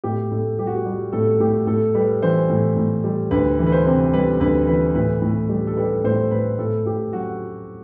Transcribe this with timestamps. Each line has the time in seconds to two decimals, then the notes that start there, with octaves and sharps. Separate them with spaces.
0.04 A2 G4
0.32 A2 A4
0.59 G3 G4
0.67 F#4
0.76 G4
0.86 G3
1.13 A2 A4
1.40 A2 G4
1.67 A2 A4
1.95 G3 B4
2.22 E3 C5
2.50 A2
2.77 A2
3.04 G3
3.31 D2 B4
3.59 E3
3.66 B4
3.72 C5
3.86 C3
4.13 G3 B4
4.40 D2 B4
4.67 E3 B4
4.95 A2 B4
5.22 A2
5.49 G3
5.67 A4
5.77 G3 B4
6.04 A2 C5
6.31 A2 B4
6.59 A2 A4
6.85 A2 G4
7.13 F#3 F#4